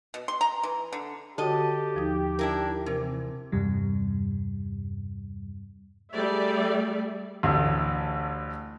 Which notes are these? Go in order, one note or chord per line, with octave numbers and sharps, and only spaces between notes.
B2
C6
A#5
E3
D3
D3 F#4 G4 A4 C#5 D#5
D#2 F3 D#4
D4 E4 A#4
C3 E3 C4 A#4
E2 G2 C3 G3
G3 A3 G4 G#4 D5 E5
A1 D2